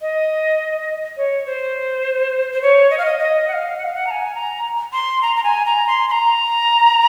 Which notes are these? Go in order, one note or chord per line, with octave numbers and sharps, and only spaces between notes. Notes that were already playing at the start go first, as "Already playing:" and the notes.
D#5
C#5
C5
C5
C#5
D#5
F5
D#5
D#5
F#5
F5
F#5
F5
F#5
A#5
G#5
A#5
C6
A#5
A#5
G#5
A#5
C6
C6
A#5